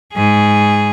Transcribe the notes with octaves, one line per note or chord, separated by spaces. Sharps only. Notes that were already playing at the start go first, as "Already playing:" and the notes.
G#2 G#4